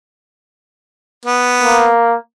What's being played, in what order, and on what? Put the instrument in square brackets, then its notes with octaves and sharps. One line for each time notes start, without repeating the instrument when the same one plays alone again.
[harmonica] B3
[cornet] A#3